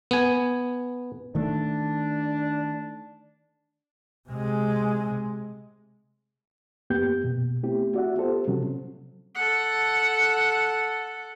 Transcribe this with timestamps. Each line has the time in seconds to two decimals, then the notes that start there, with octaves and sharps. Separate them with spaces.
0.11 B3 G#5
1.35 D#3 A3 D4
4.29 C3 G#3
6.90 F#2 A#3 B3 G4 G6
7.24 B2
7.63 A3 B3 C4 E4 G4
7.94 F#4 D5 E5 F#5
8.16 B3 F4 G4 A4 C5
8.48 C3 F#3 C#4
9.35 A4 F#5